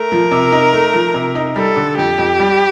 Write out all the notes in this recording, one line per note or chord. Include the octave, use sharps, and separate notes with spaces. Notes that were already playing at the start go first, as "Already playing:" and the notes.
Already playing: A3 A#4
F3
C3
D#4
A3
F3
C3
D#4
G3 A4
D3
F2 G4
F2
G3